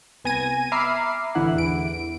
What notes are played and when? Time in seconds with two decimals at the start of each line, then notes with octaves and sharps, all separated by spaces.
0.24 C2 B3 G#5 G#6 A#6 D#7
0.72 E5 A#5 B5 D6 F6 C7
1.35 A1 D3 E3 E4 F#5
1.55 E2 E3 D7